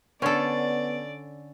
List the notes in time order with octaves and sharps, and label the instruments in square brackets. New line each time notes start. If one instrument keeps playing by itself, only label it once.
[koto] D3 A4 [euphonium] B3 [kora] C#4 C#5 [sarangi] D5